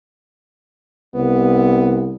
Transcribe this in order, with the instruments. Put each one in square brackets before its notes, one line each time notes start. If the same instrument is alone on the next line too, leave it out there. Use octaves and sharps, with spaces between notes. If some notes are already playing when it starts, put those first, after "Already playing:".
[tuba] C2 [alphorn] B3